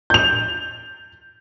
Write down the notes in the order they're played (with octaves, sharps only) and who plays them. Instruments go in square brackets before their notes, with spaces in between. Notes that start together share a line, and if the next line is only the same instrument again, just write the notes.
[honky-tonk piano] G6 F7